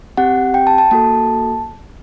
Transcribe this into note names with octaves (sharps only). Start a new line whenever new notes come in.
C4 G4 F#5
G5
A5
A5
A#3 F#4 A4 A5